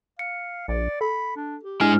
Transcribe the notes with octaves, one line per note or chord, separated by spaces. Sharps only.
F5 C#7
A#1 D5
A4 B5
D4
G4
G#2 G#3 D4 E4 G#5 F6